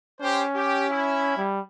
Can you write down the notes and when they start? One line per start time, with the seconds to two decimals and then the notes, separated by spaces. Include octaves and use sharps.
0.21 C#4 G4 C5
0.55 G4
0.89 E4
1.37 G3